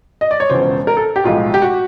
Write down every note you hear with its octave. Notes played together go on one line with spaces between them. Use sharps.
D#5
D5
C#5
E1 E2 C#3 F3 C5
A#4
A4
G4
B1 A2 F3 G#3 F4
G4
F#4